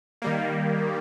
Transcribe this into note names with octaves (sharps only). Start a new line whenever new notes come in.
D#3 G3 A#3